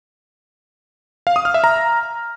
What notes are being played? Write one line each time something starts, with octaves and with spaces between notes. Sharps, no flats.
F5
D#6
F6
E5
A#5